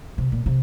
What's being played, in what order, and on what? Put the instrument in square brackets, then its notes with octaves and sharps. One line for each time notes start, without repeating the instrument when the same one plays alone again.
[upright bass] C3
A#2
C3